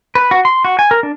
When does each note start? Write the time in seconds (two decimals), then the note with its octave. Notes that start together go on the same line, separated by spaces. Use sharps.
0.15 B4
0.31 F#4
0.45 C6
0.65 F#4
0.79 G#5
0.91 A#4
1.03 D4